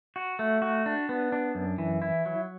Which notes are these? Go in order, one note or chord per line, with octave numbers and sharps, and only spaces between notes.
F#4
A3
F#4
D4
B3
D4
F#2
E3
E4
F#3